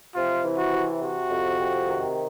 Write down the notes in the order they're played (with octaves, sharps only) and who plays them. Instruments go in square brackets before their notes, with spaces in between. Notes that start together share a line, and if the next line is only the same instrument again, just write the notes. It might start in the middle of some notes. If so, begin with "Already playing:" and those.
[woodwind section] C3 [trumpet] F4
[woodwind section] E3
[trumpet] F#4
[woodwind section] C3
[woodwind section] C3 [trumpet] F#4
[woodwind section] F2
C3
D#3